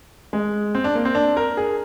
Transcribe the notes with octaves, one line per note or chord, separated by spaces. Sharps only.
G#3
C4
D4
A#3
C4
D4
A#4
G#4